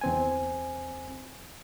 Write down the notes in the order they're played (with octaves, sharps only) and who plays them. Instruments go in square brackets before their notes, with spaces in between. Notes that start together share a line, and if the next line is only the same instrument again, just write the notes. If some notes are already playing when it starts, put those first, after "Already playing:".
[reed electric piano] E2 C4 G#5